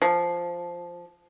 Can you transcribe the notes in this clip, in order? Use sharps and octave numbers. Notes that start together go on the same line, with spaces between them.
F3